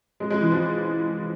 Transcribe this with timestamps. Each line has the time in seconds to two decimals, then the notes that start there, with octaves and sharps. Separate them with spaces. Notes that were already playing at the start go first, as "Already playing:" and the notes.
0.20 G#3
0.30 G#3
0.41 E3
0.52 F3